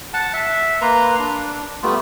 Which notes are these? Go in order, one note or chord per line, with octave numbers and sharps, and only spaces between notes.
F#5 A5
E5
A#3 B4 A#5 C6
D4
G3 A3 B3 F4